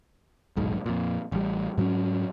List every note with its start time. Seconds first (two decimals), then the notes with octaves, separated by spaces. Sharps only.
0.56 D#1 B1 G#2
0.86 F2 A#2
1.32 A1 G3
1.78 G#2 F#3 C4 C#4